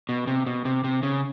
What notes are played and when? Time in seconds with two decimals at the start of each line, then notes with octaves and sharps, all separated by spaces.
0.09 B2
0.27 C3
0.46 B2
0.65 C3
0.84 C3
1.03 C#3